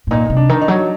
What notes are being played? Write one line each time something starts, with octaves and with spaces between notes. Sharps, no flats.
A2
A#2 D#4
C3
D4
D#3
D#4
F#3